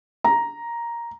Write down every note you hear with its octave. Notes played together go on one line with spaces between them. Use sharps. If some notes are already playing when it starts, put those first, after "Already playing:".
A#5